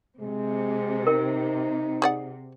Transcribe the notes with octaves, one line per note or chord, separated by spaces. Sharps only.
C3 G#3
D#4 A#4 G5
G#4 D5 F#5